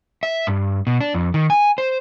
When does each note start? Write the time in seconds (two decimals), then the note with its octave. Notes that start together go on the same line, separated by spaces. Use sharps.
0.23 E5
0.47 G2
0.87 B2
1.01 D4
1.14 F2
1.34 D#3
1.50 G#5
1.78 C5